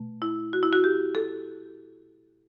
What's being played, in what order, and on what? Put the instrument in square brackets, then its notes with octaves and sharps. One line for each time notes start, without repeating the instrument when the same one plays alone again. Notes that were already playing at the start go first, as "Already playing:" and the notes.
Already playing: [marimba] B2 A3
E4
F#4
E4
F#4
G4
A4